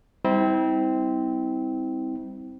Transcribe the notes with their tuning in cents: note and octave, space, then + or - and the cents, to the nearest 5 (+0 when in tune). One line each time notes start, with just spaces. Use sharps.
G3 +15 C4 -15 E4 -40